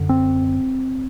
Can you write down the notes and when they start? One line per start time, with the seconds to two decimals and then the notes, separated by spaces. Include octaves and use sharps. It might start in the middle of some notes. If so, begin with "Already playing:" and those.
Already playing: F#2 D3
0.09 C4